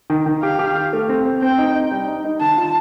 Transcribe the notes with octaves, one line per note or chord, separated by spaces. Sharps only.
D#3
D#3
G4 F5
G4
G4
A3
C4
C4
C4 G5
D#4
D#4
G3
D#4
D#4
D#3 A5
F4